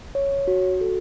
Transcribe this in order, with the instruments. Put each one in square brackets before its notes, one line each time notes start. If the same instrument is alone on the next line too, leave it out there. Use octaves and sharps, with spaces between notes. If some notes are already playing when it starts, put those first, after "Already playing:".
[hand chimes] C#5
F#4
A4